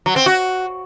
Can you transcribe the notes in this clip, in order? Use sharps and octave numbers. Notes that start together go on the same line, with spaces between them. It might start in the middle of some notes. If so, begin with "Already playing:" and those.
F#3
C4
F#4